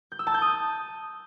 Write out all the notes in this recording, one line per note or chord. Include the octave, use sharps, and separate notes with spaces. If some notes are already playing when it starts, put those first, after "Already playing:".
G6
E6
A5
G6
D#6